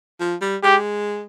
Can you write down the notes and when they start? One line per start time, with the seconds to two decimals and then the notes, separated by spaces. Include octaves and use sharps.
0.20 F3
0.41 G3
0.63 G#3 G4